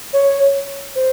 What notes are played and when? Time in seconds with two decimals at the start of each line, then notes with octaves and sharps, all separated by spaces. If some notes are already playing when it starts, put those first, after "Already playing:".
0.13 C#5
0.96 C5